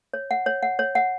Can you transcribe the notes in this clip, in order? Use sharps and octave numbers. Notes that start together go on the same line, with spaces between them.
C#5
F#5
C#5
F#5
C#5
F#5